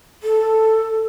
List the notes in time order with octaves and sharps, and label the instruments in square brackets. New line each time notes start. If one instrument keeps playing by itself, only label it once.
[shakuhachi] A4